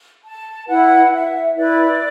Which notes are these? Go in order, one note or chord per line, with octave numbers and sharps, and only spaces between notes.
A5
E4 B4 F#5
E5
E4 B4 D5